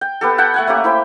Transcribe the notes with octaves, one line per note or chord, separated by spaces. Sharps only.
G5
B3 G4 A4
F#5 G5 A5 B5
A3 F#5 G#5
A3 A#3 C#4 G4
E4 C5 G5